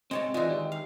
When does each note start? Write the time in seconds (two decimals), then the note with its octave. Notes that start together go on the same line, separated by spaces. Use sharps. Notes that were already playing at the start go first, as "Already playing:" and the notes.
0.11 C3 G#3 C4 C#5 A5
0.34 E3 G#3 F4 D5 D#5
0.47 D#3 G4
0.72 F5